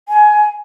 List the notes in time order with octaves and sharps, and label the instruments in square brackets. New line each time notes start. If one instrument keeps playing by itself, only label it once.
[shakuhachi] G#5